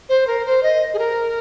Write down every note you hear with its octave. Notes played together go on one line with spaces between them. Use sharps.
C5
A#4
C5
D#5
G#4
A#4